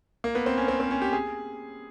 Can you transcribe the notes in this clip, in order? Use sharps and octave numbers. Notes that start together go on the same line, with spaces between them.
A#3
B3
C4
C#4
C4
C4
C#4
G4
G#4